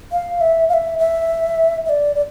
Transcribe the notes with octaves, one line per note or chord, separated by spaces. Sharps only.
F5
E5
F5
E5
E5
E5
D5
D5